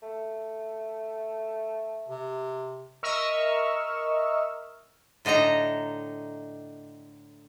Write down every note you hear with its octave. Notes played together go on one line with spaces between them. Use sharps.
A3
C3
A#4 D#5 E5 C#6 E6 F6
A2 D3 D#4 D#5 A#5